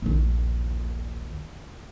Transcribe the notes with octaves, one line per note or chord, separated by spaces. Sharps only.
A#1 D#2